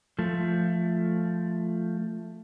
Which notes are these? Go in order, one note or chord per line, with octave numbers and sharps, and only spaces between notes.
F3 A3